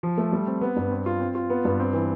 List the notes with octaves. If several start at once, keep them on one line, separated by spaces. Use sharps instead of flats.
F3
A3
G3
C4
B3
G2
C4
F4
C4
F4
B3
G2
C4
E3